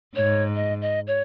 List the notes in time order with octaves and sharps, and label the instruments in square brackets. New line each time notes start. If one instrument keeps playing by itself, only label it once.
[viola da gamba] G#2 [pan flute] C#5
[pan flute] D#5
D#5
C#5